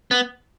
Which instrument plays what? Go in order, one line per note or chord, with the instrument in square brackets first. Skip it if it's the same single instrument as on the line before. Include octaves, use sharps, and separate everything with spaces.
[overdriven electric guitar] B3